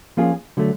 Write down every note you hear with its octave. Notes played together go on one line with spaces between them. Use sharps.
F3 A#3 C#4 F4 G#4
D3 F#3 A3